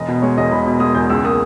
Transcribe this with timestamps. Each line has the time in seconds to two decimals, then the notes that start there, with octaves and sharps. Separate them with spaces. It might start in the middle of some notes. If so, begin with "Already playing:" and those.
Already playing: E1 D#5
0.08 B2
0.22 G#3 C#5
0.38 E2 D#5
0.51 E1 B5
0.67 B2
0.80 G#3 D#6
0.95 E2 G6
1.10 C#2 E6
1.24 A#3 D#6